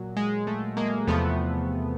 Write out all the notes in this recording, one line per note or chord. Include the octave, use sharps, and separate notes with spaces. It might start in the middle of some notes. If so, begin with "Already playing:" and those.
Already playing: A#2 F#3
G#3
A3
G#3 A#3
E2 C3 F3 A3 B3